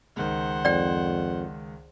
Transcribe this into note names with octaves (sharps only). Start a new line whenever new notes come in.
C#2 D#3 C5 F#5
F2 D5 G5